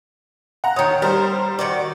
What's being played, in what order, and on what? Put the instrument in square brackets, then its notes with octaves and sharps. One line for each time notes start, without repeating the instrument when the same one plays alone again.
[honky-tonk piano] F#5 A#5
[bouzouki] D#3 C#5 [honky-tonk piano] D#6
[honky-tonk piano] G3 C5 [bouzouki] A#4
[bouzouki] D#3 F#4 D5